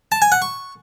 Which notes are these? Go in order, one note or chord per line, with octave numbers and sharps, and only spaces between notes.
A5
G#5
F#5
C#6